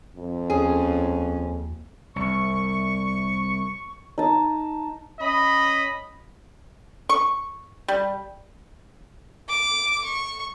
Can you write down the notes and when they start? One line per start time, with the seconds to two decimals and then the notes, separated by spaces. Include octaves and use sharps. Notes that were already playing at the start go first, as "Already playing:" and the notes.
0.16 F2
0.50 D#2 C#4 G#4
2.16 C2 C#6
4.18 D#4 A5
5.20 C#4 D#5 B5
7.09 C#6
7.88 G3
9.49 D6
10.04 C#6